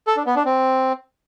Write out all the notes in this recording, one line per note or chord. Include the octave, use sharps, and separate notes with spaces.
A4
D4
B3
D4
C4